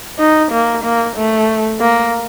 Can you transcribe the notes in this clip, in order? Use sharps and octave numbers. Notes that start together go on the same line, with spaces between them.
D#4
A#3
A#3
A3
A#3